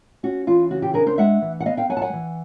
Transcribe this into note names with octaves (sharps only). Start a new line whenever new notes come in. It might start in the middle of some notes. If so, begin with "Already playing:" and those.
C#4 F#4
E3 F4
C#3 F#4
F4 G4
D4 G#4 A#4
A#4 C5
G#3 E5 F#5
E3
F#5
B3 D#5 F5
F5 G5
F#3 F#5 G#5
A5
F#5 G#5
E3